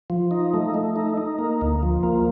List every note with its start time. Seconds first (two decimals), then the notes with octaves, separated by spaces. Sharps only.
0.10 F3
0.31 D#4
0.54 A3
0.74 A3
0.96 D#4
1.17 D#4
1.39 A#3
1.61 D2
1.83 F3
2.03 A#3